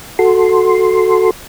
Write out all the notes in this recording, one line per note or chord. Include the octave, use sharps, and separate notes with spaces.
F#4 A4 C6